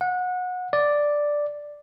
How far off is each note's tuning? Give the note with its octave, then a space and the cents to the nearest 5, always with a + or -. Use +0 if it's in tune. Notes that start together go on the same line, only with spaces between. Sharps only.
F#5 -25
D5 +0